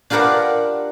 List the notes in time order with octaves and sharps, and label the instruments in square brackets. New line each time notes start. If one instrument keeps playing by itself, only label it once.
[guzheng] D4 F4 G4 A#4 B4 F#5